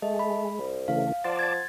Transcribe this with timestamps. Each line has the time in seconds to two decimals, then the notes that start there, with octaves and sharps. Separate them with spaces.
0.02 G#3 A3 D#5
0.19 B5
0.59 C2
0.88 C#3 E3 A3 F5
1.24 F3 D5 F#5 A5 C6
1.39 G#6 A6